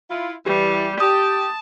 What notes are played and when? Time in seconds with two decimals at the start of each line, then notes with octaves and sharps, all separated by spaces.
0.10 E4 F4
0.46 E3 G3 G4
1.00 G4 A5 D#6